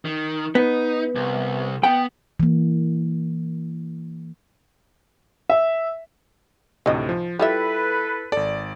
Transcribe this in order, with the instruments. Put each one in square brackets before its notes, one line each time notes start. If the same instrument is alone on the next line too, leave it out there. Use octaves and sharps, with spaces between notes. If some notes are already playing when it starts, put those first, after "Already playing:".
[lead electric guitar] D#3
[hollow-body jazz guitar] B3 [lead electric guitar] D#4
[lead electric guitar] C2
[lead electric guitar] B3 [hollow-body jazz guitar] G5
[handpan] E3 A#3
[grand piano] E5
[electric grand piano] D2 A2 C3 [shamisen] D#3 D#5
[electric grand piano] F3
[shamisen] G3 F4 E5 [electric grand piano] E4 [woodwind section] A4 B4
[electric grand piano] G#1 D5 [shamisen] A4